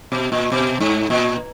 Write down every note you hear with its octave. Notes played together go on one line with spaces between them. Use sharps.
B2
A#2
B2
G#2
A#2